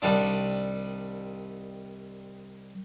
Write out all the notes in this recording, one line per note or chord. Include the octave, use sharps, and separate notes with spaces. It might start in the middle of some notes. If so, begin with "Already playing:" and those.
C2 D#3 G3 D4